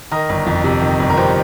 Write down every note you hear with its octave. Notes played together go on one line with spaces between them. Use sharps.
D#3 A#4 D#5
G1
F2
C3
D#3
G1
A#4
F2 G4 C5